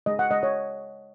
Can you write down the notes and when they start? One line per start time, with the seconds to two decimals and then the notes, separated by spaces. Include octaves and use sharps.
0.06 G#3 D#5
0.19 F#5
0.31 G#3 D#5
0.43 C#5